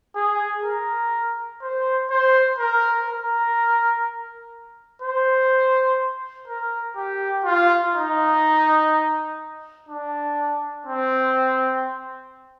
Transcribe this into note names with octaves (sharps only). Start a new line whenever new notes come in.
G#4
A#4
C5
C5
A#4
A#4
C5
A#4
G4
F4
D#4
D4
C4